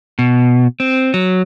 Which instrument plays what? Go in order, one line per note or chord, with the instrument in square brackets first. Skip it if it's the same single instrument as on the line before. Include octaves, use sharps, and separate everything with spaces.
[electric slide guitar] B2
C4
F#3